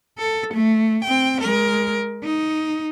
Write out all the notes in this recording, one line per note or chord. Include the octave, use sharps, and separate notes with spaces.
A4
A3
C4 G5
G#3 A#4
D#4